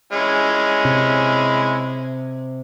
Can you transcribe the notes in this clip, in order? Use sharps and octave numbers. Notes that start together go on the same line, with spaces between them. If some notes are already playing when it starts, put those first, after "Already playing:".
G#3 C#4 E4
C3